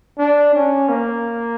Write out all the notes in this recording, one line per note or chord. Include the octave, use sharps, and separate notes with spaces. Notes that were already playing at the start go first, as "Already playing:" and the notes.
D4
C#4
A#3